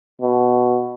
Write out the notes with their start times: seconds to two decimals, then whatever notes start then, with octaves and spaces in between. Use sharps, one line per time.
0.21 B2